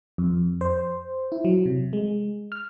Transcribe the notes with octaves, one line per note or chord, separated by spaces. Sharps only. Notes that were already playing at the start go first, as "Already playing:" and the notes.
F2
C5
E4
F#3
C3
G#3
F6